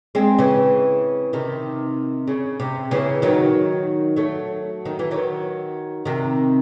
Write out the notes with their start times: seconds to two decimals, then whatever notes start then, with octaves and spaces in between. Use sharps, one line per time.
0.15 G#3 C4
0.38 C#3 E3
1.33 C3 D#3
2.27 C#3
2.60 C3
2.91 C#3 E3
3.22 D#3 F#3
4.16 F#3 A3
4.85 D#3
4.99 E3
5.11 D#3 F#3
6.05 C3 D#3